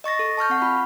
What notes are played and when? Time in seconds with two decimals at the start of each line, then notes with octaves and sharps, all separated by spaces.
0.04 D#5 C#6 A6 A#6
0.19 A4
0.37 A5 C#6 F6 G6
0.50 C4 F#5
0.62 F4 B5